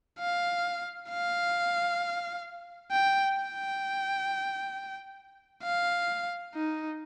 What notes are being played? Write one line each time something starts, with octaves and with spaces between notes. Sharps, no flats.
F5
F5
G5
G5
F5
D#4